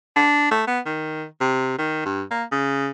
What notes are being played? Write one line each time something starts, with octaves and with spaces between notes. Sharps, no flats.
D4
A3
B3
D#3
C3
D#3
G2
A#3
C#3